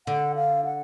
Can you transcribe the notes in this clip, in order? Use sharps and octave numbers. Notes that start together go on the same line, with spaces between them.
D3 F#5
F5
F#5